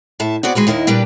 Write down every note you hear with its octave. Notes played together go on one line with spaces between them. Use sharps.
A2 E5 A5
B3 C4 F#4 G#4 D5
D#3 E3 G#3 F#4 B4
D#2 D#3 E4 A#4 D#5
A#2 G3 D4 G4 B4